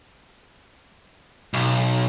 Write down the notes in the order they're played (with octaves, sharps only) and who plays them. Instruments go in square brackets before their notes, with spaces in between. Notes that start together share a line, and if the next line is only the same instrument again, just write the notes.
[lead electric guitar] B1